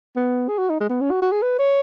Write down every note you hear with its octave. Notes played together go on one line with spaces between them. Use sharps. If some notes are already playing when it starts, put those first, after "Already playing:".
B3
G#4
F#4
D#4
G#3
B3
C#4
F#4
F#4
G#4
B4
C#5